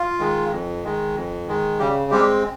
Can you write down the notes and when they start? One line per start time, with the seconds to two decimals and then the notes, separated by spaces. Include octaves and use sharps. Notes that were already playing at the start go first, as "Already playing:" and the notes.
Already playing: F4
0.20 D#3 G#3
0.52 F2
0.84 D#3 G#3
1.15 F2
1.48 D#3 G#3
1.79 C#3 G3 G4
2.11 G3 G#3 C4 G4